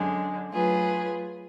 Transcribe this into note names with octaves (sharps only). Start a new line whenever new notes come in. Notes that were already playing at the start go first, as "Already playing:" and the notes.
Already playing: F#2 D3 G#3
F#3 A3 F4 G#4 B4